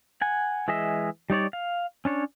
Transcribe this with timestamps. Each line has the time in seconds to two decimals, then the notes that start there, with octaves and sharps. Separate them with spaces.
0.21 F#5 G#5
0.68 E3 G#3 G#4 D#5 E5
1.30 G3 D#4 C#5 D5
1.53 F5
2.05 C#4 D4 C#5